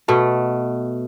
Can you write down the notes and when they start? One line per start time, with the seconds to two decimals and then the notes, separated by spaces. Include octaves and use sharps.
0.08 B2 A3